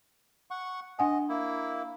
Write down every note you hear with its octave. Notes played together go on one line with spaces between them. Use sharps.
F#5 C#6
D4 D#5 F#5 G#5
A#3 E4